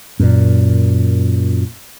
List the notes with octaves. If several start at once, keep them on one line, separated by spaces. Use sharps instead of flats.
F#2 A#2